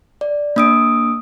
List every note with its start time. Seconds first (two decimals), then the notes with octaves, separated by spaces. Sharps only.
0.21 D5
0.56 A#3 D4 D#6 E6 D7